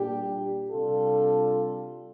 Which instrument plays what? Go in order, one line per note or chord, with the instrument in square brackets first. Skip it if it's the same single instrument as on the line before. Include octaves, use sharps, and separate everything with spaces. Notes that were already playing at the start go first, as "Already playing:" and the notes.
Already playing: [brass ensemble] A#2 G3 D4 G4
C3 G3 D4 F4 A4